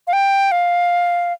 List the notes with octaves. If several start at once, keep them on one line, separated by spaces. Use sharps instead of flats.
F5
G5
F5